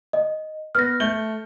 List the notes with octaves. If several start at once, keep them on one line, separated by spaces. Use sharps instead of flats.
D#5
B3 F6 A#6
A3 G6 G7